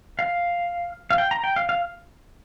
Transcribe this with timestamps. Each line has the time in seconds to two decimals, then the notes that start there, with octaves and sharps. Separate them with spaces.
0.19 F5
1.11 F5
1.18 G5
1.31 A#5
1.44 G5
1.56 F5
1.69 F5